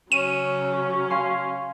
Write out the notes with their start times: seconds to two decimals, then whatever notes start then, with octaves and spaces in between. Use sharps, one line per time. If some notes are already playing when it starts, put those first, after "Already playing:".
0.12 C#3 F#3 C#4 D#7
1.10 F5 G#5 C6